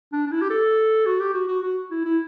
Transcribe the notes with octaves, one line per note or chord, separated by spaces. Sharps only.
D4
D4
E4
G4
A4
F#4
G4
F#4
F#4
F#4
E4
E4